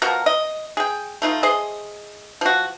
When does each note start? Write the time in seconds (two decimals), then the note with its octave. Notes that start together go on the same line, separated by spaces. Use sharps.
0.02 B2 F3 F#4 A#4
0.26 D#5
0.77 G#4 G5
1.22 A3 D#4 F4
1.43 G#4 C5 D#5
2.41 F3 F#4